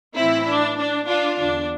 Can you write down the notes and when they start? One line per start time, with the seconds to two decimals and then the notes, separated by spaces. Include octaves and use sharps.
0.15 A2 E3 C4 E4
0.47 D4
0.78 D4
1.08 D4 F4
1.38 E2 D3 D4